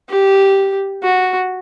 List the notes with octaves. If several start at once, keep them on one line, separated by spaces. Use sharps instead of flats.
G4
F#4